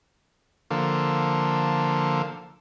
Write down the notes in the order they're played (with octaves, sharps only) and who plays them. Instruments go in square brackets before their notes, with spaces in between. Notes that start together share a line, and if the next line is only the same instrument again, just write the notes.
[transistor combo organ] D3 F3 A#3 A4